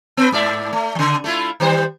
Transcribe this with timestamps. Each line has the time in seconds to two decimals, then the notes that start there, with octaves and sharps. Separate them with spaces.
0.17 B3 B4
0.32 G#2 D5 E5
0.73 A3
0.95 C#3 F3
1.24 A3 E4 F4
1.60 D#3 G3 C5